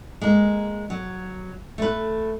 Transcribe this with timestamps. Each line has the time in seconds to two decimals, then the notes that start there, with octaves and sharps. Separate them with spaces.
0.21 G#3 A#3 A#4
0.90 F#3
1.78 A3 B4